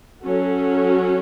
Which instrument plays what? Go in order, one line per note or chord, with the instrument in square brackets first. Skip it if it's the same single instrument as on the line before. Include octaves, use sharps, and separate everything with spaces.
[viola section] F#3 C#4 F#4 A4